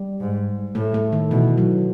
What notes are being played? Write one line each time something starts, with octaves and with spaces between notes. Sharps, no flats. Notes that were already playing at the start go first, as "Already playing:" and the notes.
Already playing: G3
G#2
A2 A3
A3
D#3
B2 E3
F#3